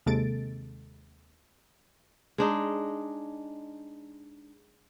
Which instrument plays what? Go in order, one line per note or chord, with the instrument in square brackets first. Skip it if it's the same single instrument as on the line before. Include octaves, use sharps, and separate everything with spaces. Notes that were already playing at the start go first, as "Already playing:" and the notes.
[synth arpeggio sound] D#2 C3 G#3 A4 A6 D7
[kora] G#3 D4 D#4